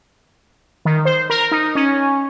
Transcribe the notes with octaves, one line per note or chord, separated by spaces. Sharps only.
D#3
C5
A#4
D#4
C#4